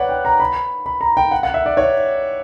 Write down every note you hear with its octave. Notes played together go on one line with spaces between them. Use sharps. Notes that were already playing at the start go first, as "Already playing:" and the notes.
Already playing: B4 C#5 D5 F#5
G5
A#5
B5
B5
A#5
G5
F#5
F#5
E5
D5
C#5